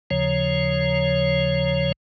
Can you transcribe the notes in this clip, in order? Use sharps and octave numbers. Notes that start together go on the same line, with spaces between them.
D#2 C#3 F3 C#5